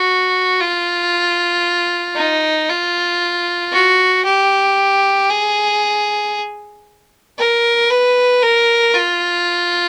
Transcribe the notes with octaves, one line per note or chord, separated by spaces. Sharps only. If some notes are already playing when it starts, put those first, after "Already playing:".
Already playing: F#4
F4
D#4
F4
F#4
G4
G#4
A#4
B4
A#4
F4